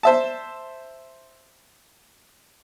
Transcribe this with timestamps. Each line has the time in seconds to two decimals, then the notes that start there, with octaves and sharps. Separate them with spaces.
0.03 C5 E5 A5